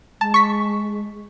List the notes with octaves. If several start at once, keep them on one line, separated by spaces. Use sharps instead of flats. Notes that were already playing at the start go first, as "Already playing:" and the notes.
G#3 A5
C#6 B6